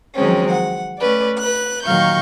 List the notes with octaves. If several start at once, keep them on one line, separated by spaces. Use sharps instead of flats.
D#3 F3 F#3 G#3 C4 C#4
F#5
A3 C#4 B4 D5
B4 F#6
A#2 D#3 F#3 F5 C#6 G6